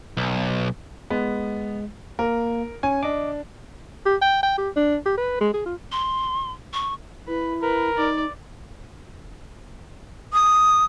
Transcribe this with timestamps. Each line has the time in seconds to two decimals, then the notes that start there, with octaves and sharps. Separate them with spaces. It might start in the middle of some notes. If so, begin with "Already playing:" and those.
0.17 B1
1.10 G#3 B3
2.19 A#3 A#4
2.83 C#4 C#5 G#5
3.03 D4 D#5 D6
4.06 G4
4.22 G5
4.43 G5
4.58 G4
4.76 D4
5.06 G4
5.18 B4
5.41 G#3
5.54 G#4
5.66 F4
5.92 C6
6.73 C#6
7.28 E4 B4
7.62 A#4 B4
7.97 D#4 D5
10.33 D#6